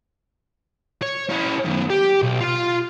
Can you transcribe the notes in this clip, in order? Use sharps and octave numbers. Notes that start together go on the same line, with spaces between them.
C#5
C#4 E4
F#2 D#3
G4
B1
F4 F5